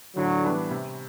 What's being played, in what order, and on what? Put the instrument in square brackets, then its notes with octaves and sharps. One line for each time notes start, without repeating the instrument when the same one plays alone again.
[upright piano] A2 [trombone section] D3 F#3
[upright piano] E3 G3 B3 D4
C3